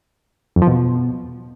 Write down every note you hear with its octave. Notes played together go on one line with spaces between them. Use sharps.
F2
F3
B2